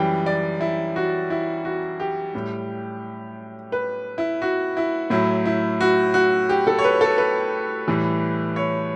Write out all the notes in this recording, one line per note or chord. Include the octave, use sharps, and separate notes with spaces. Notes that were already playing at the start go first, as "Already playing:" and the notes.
Already playing: F#2 E3 G3 G5
D5
E4
F#4
E4
F#4
G4
A2 G3
B4
E4
F#4
E4
A2 F#3 E4
E4
F#4
F#4
G4
A4
C#5
B4
A4
B4
A2 E3 G3
C#5